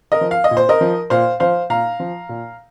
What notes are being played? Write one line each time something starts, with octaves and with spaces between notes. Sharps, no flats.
A#4 D#5
F3
F5
D#5
A#2
C5
A#4 D#5
F3
A#2 C5 F5
F3 C5 F5
A#2 F5 A#5
F3
A#2